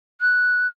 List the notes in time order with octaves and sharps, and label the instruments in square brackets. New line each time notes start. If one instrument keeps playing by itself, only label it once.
[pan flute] F#6